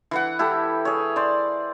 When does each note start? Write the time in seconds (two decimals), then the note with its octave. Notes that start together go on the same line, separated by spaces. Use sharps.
0.11 E3 B4 F#5
0.39 E4 G4 A4
0.85 G#4 C#5
1.16 C5 D5